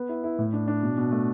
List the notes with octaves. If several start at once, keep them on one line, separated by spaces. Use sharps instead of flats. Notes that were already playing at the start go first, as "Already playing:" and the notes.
Already playing: B3
E4
E4
A2
D4
D4
B2
B2
A3